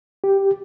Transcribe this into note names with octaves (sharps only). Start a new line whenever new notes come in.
G4